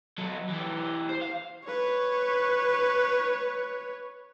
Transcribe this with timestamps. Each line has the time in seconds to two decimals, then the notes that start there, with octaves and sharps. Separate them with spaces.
0.18 F#3 A4
0.50 E3 G4
1.09 C5
1.22 F5
1.65 B4 C#5